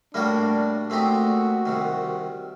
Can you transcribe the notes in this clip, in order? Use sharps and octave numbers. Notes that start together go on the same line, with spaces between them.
A2 G3 A#3 D4 F#4 A#4
A#2 A3 C4 D#4 F#4 G4
C2 C3 D#3